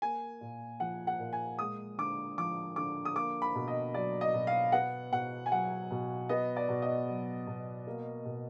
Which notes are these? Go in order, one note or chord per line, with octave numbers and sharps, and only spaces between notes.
A#3 G#5
A#2
F3 F#5
F#5
A#2
G#5
G#3 D#6
D3 D6
F3 D6
D3 D6
D#6
A#3 D6
B5
B2
D#5
F#3 D5
D#5
B2
F5
B3 F#5
B2 F#5
G#5
F#3 F#5
B2
B3 D#5
D5
B2
D#5
F#3
B2
A#3
B2